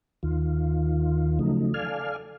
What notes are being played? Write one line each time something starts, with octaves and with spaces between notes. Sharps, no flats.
D#2 D#3 F4
C#3 F3 F#3 A3 D#4
A4 D5 F5 G#5 F6